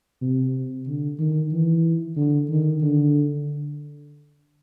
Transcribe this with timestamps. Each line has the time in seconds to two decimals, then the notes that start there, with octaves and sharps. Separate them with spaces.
0.22 C3
0.87 D3
1.19 D#3
1.52 E3
2.17 D3
2.50 D#3
2.82 D3